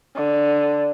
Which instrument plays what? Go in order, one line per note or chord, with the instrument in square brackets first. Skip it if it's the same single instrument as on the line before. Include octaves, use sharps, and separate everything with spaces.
[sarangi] D3